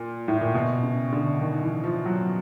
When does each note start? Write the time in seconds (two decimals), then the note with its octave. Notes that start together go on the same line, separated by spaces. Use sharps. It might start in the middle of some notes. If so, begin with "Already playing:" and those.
Already playing: A#2
0.28 A2
0.41 A#2
0.54 B2
0.83 C#3
1.12 D3
1.41 D#3
1.62 E3
1.84 F3
2.06 F#3